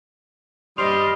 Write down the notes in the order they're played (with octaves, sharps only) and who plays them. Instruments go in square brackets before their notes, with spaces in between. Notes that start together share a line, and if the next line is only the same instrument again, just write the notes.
[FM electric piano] G2 C5 F6 [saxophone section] G3 [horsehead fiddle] D#5 [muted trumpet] C6